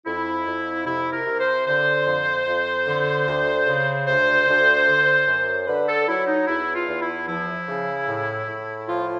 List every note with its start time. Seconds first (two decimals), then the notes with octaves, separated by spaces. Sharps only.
0.06 F2 E4
0.46 F2
0.86 C3 E4
1.13 A#4
1.27 C3
1.40 C5
1.67 D3 C5
2.06 F2
2.47 F2
2.86 D3
3.27 D2
3.67 C#3
4.07 D2 C5
4.47 D2
4.87 D3
5.27 F#2
5.67 D3 B4
5.88 A4
6.08 F#3 E4
6.27 D#4
6.47 E2 E4
6.75 F4
6.88 E2
7.01 E4
7.28 F3 E4
7.68 C#3
8.08 A2
8.48 A2
8.88 F3 F4